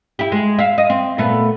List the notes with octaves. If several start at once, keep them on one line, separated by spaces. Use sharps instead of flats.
E4 G4
G#3
E5 F5
D#5
C4
A#2 A3 B3